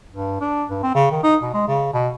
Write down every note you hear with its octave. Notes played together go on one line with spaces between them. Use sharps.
G2
D4
G2
C4
C#3
D#3
D#4
B2
G#3
C#3
B2